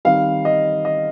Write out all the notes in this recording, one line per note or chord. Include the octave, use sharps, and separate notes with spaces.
D#3 G3 C4 F5
D#5
D#5